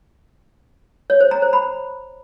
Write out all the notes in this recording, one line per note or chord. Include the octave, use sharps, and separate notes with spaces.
C#5
C5
A#5
C5
B5